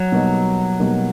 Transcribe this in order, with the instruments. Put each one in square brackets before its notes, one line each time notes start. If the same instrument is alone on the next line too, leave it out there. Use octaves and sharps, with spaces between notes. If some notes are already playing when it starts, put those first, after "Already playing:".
Already playing: [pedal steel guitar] F#3
[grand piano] B2 G3 A#3 D#4
B2 G3 A#3 D#4